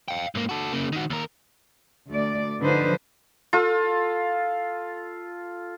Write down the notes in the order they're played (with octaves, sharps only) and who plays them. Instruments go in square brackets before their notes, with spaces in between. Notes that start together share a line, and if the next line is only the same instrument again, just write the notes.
[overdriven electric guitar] F5 G5
G#2 A#3
F#4 A4
C#3 A#3
D#3 F#4
D#2 A#4
[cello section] D2 A3 D5
D3 F3 D#4 B4 C5
[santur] F4 A4